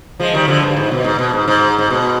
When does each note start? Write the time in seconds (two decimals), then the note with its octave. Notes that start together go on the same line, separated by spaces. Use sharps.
0.20 F3 G#3
0.33 D#3 G3
0.48 D3 F3
0.62 G2
0.76 G#2
0.91 B2
1.04 G#2
1.19 B2
1.33 G#2
1.48 G#2
1.78 G#2
1.90 B2